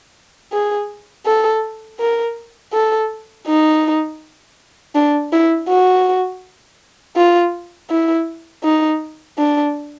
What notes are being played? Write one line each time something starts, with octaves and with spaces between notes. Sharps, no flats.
G#4
A4
A#4
A4
D#4
D4
E4
F#4
F4
E4
D#4
D4